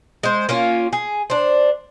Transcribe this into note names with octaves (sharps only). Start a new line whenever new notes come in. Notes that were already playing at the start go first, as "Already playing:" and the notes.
G#3 C5
A#3 C#4 F4
G#4
D4 C5